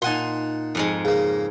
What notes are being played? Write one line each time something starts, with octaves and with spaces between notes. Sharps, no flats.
A#2 D#4 F#5 G#5 A5 C6
F2 G#2 G#3
C#3 A#3